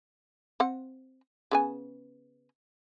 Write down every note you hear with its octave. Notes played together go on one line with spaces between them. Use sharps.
C4 F#5
C#3 B3 G#5